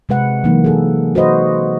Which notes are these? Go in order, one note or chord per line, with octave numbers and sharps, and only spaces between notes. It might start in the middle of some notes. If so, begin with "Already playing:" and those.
C3 G#3 B4 F#5
E3 F#3 A#3 D#4
G#4 A4
F#4 B4 C5 D#5